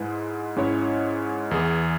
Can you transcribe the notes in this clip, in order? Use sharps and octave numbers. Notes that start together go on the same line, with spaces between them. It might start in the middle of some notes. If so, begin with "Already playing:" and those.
Already playing: G#2 G#3 E4 B4
G#2 G#3 C#4 E4 C#5
E2 E3 B3 G#4